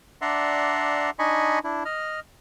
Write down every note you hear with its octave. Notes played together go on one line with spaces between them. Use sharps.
D4 D5 E5 F#5 A#5 C6
D4 D#4 D#5 G#5 B5 C#6
D4 E4
D#5 F6